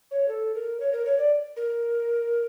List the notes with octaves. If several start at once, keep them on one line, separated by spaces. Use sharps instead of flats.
C#5
A4
A#4
C#5
A#4
C#5
D5
A#4